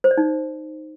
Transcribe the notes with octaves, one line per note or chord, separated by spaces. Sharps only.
C5
D5
D#4